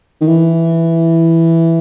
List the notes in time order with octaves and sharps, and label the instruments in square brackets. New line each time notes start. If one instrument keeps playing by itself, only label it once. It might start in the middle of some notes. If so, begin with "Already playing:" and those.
[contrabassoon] D#3
E3